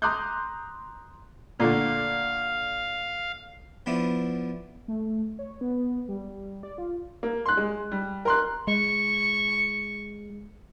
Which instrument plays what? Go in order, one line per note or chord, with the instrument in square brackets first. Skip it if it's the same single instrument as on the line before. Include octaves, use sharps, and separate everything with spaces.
[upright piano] A#5 C6 D6 D#6 F#6 G6
[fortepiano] A#2 D3 A3 [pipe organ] F5
[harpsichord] F3 B3 D4 E4
[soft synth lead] A3
C#5
B3
G3
D5
F4
[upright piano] A#3
C6 F#6
G#3
G3
A#4 C6 F#6
[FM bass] G#3 [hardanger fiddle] C#6